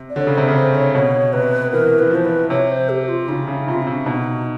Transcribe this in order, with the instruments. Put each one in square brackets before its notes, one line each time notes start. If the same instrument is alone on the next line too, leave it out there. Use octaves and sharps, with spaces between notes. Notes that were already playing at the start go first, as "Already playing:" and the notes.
Already playing: [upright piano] C3
[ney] D5
[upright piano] D3 [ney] C#5
[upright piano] C#3
[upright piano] C3 [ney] C5
[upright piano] C#3
[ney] C5
C#5
[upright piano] B2 [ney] C#5
[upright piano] C3 [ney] B4
[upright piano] E3 [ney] A#4
[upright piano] E3 [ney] B4
[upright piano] F3 [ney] C5
[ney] B4
[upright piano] C3 [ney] C#5
[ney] C5
G4
F4
[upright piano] C#3 [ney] D#4
[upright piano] C#3
[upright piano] C3 [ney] F4
[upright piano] C3 [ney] C#4
[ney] D4
[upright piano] B2 [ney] D#4